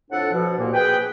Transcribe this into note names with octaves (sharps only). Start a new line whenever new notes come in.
F2 A2 D4 A4 F#5
B2 F3
C2 A#2 A#3
G#4 B4 G5